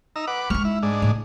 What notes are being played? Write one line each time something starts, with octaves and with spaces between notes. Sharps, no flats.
D#4 A#5 E6
B4 F#5 D6
G#3 D#4 C#6 F6
E4
G#2 D4
A2